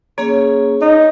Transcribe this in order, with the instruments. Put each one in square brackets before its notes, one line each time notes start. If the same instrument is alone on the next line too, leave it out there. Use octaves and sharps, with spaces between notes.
[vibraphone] A#3 C#4 G#4 [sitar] C#5
[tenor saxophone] D#4